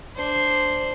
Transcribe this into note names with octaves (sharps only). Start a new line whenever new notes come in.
D4 C5